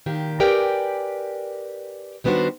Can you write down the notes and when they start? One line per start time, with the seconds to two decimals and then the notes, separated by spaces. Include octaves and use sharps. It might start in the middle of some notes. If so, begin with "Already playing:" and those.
0.06 A#2 D#3 G4
0.40 G4 A#4 B4 D5 G5 G#5
2.24 D#3 G3 B3 D4 F#4 C5